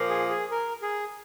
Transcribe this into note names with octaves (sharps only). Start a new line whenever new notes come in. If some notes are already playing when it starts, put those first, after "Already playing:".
Already playing: A#2 F3 A#3
G#4
G#4
A#4
G#4